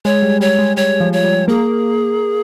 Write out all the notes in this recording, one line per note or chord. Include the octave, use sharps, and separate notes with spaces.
G#3 C#5
G3
G3 C#5
G#3
G3 C#5
F3
C#5
G3
A#3 G#4